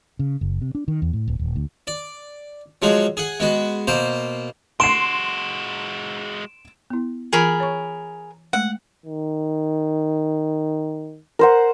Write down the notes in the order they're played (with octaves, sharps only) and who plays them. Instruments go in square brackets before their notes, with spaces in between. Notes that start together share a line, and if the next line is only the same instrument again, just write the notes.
[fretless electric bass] C#3
F#1
C3
D4
D#3
E2
A2
D1
D#1
D2
[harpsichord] D5
F3 F#3 G#3 F#4
G#4 F#5
G#3 B3 F#4
B2 A#3 C5
[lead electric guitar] G#3 F#4 [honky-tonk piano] C6 C7 [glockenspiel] D7 E7
[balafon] B3 E4
[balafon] E3 F4 [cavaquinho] G#4 A#4 B5
[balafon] C#5 C#6
[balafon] G#3 A3 [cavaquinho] F#5
[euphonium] D#3
[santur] A#4 C5 F#5